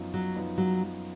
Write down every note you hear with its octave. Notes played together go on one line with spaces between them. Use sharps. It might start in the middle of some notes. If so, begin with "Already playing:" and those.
Already playing: F#2 F3 B3 D#4
F#3
F#2 F3 B3 D#4
F#3